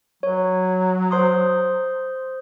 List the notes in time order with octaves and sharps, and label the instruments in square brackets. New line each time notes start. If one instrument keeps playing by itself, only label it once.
[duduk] F#3 [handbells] C#5
[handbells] C5 C6 D#6